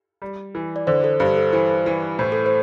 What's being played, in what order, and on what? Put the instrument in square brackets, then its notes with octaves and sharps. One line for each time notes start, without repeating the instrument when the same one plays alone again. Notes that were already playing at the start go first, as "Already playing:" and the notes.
[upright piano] G3
E3
[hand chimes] D5
[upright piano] D3 [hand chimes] C5
[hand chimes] A4
[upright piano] G2 [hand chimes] C5
[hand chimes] A4
[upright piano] E3 [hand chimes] C5
[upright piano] E3
[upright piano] A2 [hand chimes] C5
[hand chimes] A4
C5